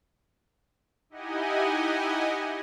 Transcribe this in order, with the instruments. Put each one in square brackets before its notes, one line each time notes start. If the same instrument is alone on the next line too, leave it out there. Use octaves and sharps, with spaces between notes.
[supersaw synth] D#4 E4 G4 D#5 F#5 G#5